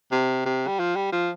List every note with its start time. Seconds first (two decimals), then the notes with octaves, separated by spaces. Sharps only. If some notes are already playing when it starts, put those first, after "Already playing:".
0.11 C3
0.46 C3
0.67 G3
0.79 F3
0.96 G3
1.12 F3